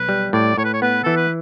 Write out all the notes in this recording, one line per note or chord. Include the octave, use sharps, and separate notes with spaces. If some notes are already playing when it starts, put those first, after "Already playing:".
Already playing: B1 B4
G3
A2 D5
A2 C#5
B4
C#5
B3 B4
E3 A4
B4